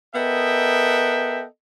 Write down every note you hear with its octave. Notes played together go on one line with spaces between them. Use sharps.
B3 A4 A#4 D#5 E5 G5